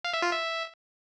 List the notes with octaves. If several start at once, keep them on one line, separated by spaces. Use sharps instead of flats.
F5
E5
F4
E5